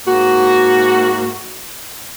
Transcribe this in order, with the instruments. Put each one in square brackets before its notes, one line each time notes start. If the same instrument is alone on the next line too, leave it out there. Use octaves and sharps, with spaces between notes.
[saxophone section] G#2 A#3 F#4